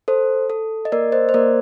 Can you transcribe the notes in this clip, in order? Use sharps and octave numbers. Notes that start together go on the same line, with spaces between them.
A4 C5
A4
D#5
A#3 A#4 D5
C5 D#5
C5
A#3 A#4 D5